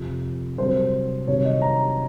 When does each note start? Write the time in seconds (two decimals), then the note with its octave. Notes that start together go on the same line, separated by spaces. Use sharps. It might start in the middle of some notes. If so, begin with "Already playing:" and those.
Already playing: F2 C3 F3
0.58 C2 C3 F#3 C5
1.27 C2 C3 D#3 F#3 C#5
1.44 D#5
1.62 A#5